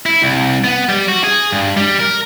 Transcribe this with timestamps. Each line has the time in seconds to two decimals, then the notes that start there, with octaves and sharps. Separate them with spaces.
0.06 E4
0.22 C2
0.64 B3
0.89 G3
1.08 F#4
1.24 G#4
1.52 G2
1.77 G3
2.00 A#4